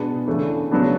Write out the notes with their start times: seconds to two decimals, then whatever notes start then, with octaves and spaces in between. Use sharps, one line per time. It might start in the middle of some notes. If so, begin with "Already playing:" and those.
Already playing: B2 G#3 B3 D4
0.27 C#3 E3 A3 D4
0.71 C#3 F#3 B3 D4